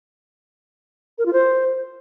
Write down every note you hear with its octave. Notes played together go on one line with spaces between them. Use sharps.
A#4
F4
C5